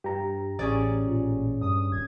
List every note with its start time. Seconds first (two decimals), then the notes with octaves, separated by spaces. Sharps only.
0.04 G2 G4 A#5
0.59 A1 C#4 G#4 D5
1.05 A#2
1.61 G2 D#6
1.92 D#1 G#6